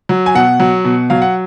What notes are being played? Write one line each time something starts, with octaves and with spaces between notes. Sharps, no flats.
F#3
G#5
B2 F#5
F#3
B2
F#3 F5
F#5